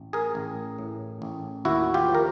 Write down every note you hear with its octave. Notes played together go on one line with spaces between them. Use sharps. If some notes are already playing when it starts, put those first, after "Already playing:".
Already playing: A1
G#4 A#4
A1
A2
A1
D#2 E4 F#4
F4 G4
F3
A#4